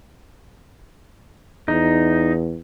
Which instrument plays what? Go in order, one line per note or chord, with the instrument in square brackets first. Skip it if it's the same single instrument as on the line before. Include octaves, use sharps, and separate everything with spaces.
[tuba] E2 [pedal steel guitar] D#4